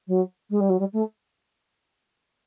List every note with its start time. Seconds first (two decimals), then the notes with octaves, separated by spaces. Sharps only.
0.07 F#3
0.50 G#3
0.60 G3
0.69 F#3
0.79 G3
0.92 A3